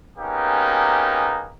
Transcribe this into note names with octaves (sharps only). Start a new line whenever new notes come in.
A#3 B3 C#4 D#4 G4 G#4